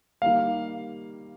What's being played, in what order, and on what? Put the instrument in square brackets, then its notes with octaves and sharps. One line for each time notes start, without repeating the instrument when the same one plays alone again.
[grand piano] D#3 G3 A#3 [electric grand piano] F5